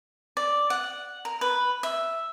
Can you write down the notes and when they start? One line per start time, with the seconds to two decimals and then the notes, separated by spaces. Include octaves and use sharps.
0.37 D5
0.70 F#5
1.25 A#4
1.41 B4
1.83 E5